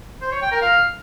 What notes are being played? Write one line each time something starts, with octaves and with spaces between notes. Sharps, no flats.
C5
C#5
G5
A#4
F5